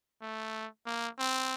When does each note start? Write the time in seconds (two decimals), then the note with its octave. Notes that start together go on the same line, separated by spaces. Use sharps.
0.21 A3
0.86 A#3
1.18 C4